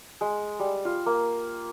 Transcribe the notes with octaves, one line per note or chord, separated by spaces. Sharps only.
G#3
G3
F4
A#3